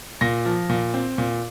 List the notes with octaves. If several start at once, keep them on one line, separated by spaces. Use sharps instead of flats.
A#2 A#6
F3
A#2
C4
A#2